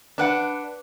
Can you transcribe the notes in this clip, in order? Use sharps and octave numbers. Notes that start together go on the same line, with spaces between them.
D4 B4 F#5